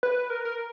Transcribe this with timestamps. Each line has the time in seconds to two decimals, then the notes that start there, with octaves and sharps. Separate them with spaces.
0.03 B4
0.30 A#4
0.45 A#4